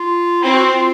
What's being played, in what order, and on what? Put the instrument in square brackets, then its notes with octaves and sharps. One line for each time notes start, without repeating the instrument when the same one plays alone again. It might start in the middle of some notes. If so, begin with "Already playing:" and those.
Already playing: [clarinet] F4
[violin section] C4 [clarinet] E4
[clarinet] F#4
F4